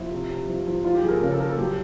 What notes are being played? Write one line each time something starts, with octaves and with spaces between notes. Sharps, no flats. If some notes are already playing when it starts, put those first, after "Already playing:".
Already playing: F3 E4
C3
C3
F3
F3
F3 F4
G4
F3 G#4
A#4
A4
C#3 A#4
A4
F3 A#4
A4
F#3 G4